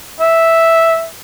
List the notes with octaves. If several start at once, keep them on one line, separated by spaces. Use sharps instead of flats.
E5